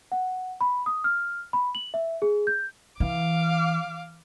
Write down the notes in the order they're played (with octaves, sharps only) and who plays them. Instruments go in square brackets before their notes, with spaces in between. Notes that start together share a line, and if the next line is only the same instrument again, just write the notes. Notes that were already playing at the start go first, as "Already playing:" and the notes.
[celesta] F#5
B5
D#6
F6
B5
F#7
E5
G#4
G6
[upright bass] E3 [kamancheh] F5 D6